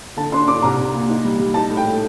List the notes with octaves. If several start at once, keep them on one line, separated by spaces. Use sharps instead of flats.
D3 A5
D4 C6
D4 D6
C2 A#5
C2
A#2
D#4
G3
G3
D#4 A5
A2
G5
A3